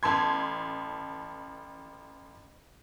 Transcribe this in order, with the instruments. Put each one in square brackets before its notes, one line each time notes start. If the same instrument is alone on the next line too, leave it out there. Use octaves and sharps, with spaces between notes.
[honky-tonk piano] A1 A5 C6 G#6